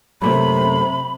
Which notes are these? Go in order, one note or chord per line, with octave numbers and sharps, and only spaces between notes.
F#2 C3 A3 A#3 B5